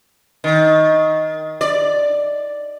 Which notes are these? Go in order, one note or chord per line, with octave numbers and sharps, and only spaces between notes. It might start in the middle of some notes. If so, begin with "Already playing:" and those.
D#3
D5